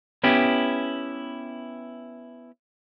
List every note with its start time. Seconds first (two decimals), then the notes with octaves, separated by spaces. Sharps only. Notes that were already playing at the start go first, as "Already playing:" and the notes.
0.23 B3 C#4 E4 G4